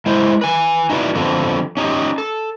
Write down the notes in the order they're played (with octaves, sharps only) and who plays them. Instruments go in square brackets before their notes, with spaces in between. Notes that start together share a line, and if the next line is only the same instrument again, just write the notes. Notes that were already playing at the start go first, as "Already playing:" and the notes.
[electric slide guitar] G#3 E4 C5
B4 G#5
D#4 E4 F#4 B4 D5
D3 F3 B3 C4 A4
C#4 D#4 G4
A4